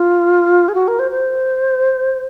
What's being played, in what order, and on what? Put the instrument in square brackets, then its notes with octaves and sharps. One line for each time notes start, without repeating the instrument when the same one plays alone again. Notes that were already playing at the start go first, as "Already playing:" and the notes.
Already playing: [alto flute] F4
G#4
F#4
A#4
C5
C5